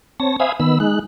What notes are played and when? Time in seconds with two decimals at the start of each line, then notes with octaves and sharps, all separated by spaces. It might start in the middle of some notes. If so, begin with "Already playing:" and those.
0.20 C4 C#5 A5 A#6
0.40 C5 E5 F5 G#5 B5 D#6
0.60 D#3 B3 B5 E6
0.80 G#3 D#4 F#6